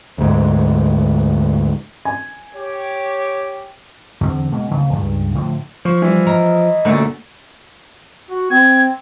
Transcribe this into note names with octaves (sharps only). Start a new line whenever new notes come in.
D2 G#2
G#5
G4 C#5
E2 D3 C4
B2 G#3 A#3
D1 C#3
C#2 G2
A2 D3 F3
F3 C#6
E3 G3
A#4 D#5
F#2 A#2 D3 A3 C#4 F#4
F#4
C4 G#6